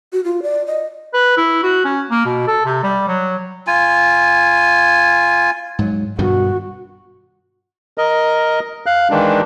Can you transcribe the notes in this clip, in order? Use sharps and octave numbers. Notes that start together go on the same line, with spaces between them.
F#4
F4
D5
D#5
B4
E4
F#4
C#4
A#3
B2
A4
C3
G3
F#3
F4 G#5
G#2 F#3
G2 B2 D#3 F#4
A#4 D#5
F5 F#6
D#3 E3 G#3 D4